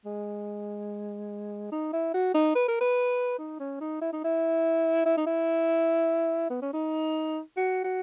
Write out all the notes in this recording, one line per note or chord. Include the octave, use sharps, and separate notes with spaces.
G#3
D#4
E4
F#4
D#4
B4
A#4
B4
D#4
C#4
D#4
E4
D#4
E4
E4
D#4
E4
B3
C#4
D#4
F#4
F#4